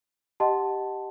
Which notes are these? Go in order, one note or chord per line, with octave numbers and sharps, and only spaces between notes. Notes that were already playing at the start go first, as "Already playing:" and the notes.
G4 D#5 F#5 A5 C6